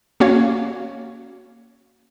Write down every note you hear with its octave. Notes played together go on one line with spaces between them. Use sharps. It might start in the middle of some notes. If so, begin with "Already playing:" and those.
A#3 C#4 F#4 C#5 F5